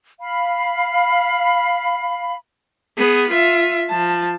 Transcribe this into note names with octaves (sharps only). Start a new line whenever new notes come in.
F5 B5
B3 G#4
F4 E5
F3 A5